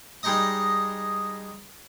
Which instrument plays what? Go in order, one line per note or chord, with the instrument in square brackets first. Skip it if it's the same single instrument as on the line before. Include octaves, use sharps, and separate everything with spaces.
[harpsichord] G3 G#3 D#4 D#5 D#6